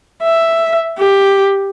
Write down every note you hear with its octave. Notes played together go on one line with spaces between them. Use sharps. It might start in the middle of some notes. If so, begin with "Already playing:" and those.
E5
G4